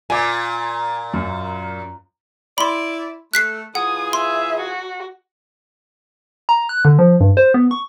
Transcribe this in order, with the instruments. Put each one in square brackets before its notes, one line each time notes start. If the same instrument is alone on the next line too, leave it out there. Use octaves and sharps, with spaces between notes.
[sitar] A#2 [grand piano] G#5 D6
[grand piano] F#2
[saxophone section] E4 D5 [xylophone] B5 C6
[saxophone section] A3 [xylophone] F#6 B6 C7
[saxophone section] E3 F4 G#4 [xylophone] F#5 [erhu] D#6
[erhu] E5 [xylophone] C6
[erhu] F#4
[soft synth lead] A#5
F#6
D3
F3
G2
C5
B3
C#6